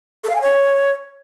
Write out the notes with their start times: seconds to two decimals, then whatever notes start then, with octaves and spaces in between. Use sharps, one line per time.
0.24 A4
0.29 F5
0.35 G#5
0.41 C#5